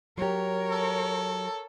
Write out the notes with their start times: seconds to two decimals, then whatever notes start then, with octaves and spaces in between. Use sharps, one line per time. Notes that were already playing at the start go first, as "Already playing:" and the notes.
0.18 F#3 G4 A#4 C#5
0.72 A4